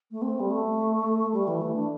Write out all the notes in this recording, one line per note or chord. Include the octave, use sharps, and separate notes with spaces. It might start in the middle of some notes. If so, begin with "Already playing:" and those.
A3
C4
G3
A3
G3
E3
A3
D4